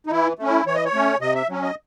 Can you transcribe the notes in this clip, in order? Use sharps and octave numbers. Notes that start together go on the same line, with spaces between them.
D#4
E3 E4
A3 C#4
E4
E3 C#5
D#5
C#5
A3 C#4
C3 D#5
E5
F#3 C#4
D#5